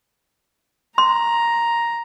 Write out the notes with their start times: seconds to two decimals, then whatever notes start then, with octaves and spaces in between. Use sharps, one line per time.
0.98 A#5 C6